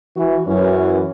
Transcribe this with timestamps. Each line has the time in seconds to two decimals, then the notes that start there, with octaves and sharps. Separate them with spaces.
0.17 E3 F#4
0.47 F#2 E3 C#4